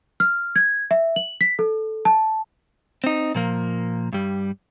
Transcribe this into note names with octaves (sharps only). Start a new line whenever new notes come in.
F6
G#6
E5
F#7
B6
A4
A5
C4 D#4
A#2 F3 A#3
G2 G3